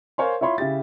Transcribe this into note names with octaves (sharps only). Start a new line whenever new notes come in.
A#4 C5 C#5 F5 G#5 C6
E4 F4 C#5 B5 C6
C#3 E4 G4 A6